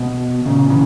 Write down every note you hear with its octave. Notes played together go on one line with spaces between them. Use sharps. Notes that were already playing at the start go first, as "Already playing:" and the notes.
Already playing: B2
A#2 C#3
C#3 E3